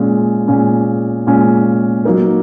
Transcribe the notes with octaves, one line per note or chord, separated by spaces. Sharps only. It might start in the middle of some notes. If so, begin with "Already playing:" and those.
Already playing: A#2 G#3 C#4
A#2 G#3 C#4
A#2 G#3 C#4
F#3 A#3 D#4 A#4